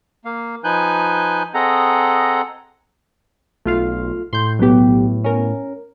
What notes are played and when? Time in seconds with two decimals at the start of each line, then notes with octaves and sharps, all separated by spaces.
0.25 A#3 F5
0.64 F3 D#4 B4 G#5 F#6 G6
1.54 C4 G#4 A4 D#5 F#5 A#5
3.65 B1 A3 F4 F5
4.33 A2 C6 G6
4.59 B1 F#3 B3 G4
5.24 C#4 A#4